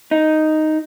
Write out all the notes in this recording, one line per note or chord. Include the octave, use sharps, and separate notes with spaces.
D#4